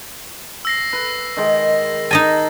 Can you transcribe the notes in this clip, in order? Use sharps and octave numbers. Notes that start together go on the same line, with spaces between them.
E6 A#6 C7
B4
D#3 G#3
D#4 D#5 G#5 A5 A6